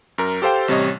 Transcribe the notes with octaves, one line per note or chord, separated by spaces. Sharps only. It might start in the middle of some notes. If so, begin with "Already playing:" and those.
F#2 A#4
G4 A4 C5 F5 G5
A1 C3 G3 C#5 D#5